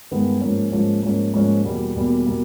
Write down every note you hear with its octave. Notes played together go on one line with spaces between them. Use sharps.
G2 D#3 G#3 B3
G#2 F3 A#3 C#4
G#2 F3 A#3 C#4
G#2 F3 A#3 C#4
G#2 F3 A#3 C#4
E2 B2 G3 A#3
E2 B2 G3 A#3
B2 G3 A#3